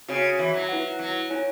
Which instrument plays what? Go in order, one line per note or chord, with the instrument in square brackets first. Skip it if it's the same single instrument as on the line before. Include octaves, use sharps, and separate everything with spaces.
[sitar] C#3 [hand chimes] F#4 C#5 G#5
[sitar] E3
F#3
[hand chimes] E4 B4 F#5
[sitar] F#3
[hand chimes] E4 C#5 G#5